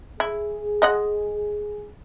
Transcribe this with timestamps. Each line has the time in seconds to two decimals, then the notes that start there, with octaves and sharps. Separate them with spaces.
0.20 E4 G#4
0.82 G#3 D#5 F#5